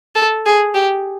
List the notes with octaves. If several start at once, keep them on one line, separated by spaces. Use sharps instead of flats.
A4
G#4
G4